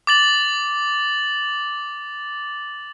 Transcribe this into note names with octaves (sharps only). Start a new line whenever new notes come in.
D6 A6 F#7